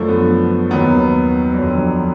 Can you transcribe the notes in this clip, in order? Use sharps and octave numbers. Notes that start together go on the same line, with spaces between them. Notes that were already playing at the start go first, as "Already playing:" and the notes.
Already playing: F#2 D3 F3 A3
B3
D#2 D#3 F#3 B3
F2 D3 F#3